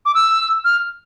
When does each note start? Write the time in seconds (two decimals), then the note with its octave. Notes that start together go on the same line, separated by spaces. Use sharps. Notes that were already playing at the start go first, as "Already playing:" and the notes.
0.06 D6
0.15 E6
0.65 F6